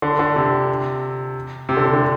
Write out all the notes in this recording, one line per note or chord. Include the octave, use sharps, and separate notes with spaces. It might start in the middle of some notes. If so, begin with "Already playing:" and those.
D3
D3
C3
C3
D3
C3
D3